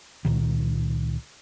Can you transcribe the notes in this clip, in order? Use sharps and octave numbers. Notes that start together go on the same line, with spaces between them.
C#2 A#2 D#3